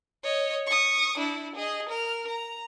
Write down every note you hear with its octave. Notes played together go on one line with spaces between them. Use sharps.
C#5 D#5
C#6 D#6
D4 E4
G#4 D#5
A#4 F6
A#5